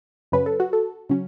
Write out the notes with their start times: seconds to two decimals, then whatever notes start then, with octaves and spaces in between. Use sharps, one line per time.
0.32 F#2 C#3 F#3 C#4 B4
0.46 A4
0.60 F#4
0.73 A4
1.10 C#3 F#3 C#4